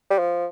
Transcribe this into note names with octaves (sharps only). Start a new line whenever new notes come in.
G3
F3